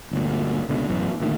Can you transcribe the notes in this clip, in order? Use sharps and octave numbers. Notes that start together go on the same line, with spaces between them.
G1 D2 A#2
C#2 B2 D3
A1 F#2 B2 E3
D2 A#2 D#3